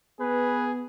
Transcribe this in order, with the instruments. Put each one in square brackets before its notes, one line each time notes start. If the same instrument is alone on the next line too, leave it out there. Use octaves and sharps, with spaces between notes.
[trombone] B3 [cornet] G#4 [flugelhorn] B4